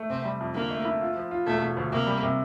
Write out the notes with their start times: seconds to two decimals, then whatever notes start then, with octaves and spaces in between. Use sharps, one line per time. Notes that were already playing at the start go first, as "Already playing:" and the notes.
Already playing: A3
0.10 C3 C4
0.25 G3
0.41 F2
0.55 D3 A#3
0.71 A3
0.85 E4
1.01 F4
1.16 F3
1.31 F4
1.46 E1 A3
1.62 E1
1.77 D2
1.92 C3 A#3
2.07 G3
2.23 C3